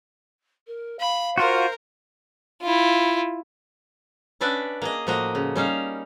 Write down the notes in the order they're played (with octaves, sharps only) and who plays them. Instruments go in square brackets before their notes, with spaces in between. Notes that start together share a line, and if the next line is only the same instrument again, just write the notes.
[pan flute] A#4
[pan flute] F5 [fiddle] B5
[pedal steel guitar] F4 F#4 [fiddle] A#4 [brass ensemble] C5
[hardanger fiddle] E4 F4
[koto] C#4 D4 B4 D5 E5 F#5
A#3 G#4 D#5
A2 F3 A#3 F#4 D#5
C#3
G3 C#4 D#4 F5